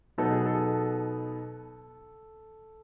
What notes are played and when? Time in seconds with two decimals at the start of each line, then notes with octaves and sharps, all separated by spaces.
0.18 B2 F#3 B3 D#4 A4
0.32 G#4
0.46 A4
0.54 G#4
0.59 A4